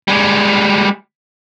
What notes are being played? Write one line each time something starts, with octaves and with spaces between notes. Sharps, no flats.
G3 G#3